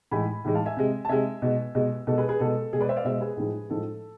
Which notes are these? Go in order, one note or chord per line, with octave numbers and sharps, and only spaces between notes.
A2 E3 G#3 G#5 B5
A2 E3 G#3
F5 A5
E5 G#5
C3 G#3
A5
C3 G#3 E5 G#5
B2 G#3
B2 G#3
B2 G#3 A4
G#4 B4
G#4 B4
B2 G#3 A4
B2 G#3 G#4
B4 D5
C5 E5
D5 F5
B2 G#3 C5 E5
G#4 B4
A2 F3 G#3
A2 F3 G#3 A4